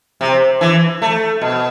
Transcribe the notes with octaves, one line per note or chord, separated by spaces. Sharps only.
C3
E3
A3
B2